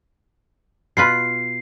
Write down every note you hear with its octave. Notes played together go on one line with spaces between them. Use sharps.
B2 F4 B4 C7